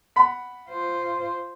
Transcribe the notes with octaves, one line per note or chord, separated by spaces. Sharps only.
F#5 B5 B6
F4 C5